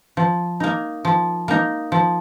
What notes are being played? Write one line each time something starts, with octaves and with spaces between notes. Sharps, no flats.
F3
A#3 D#4
F3
A#3 D#4
F3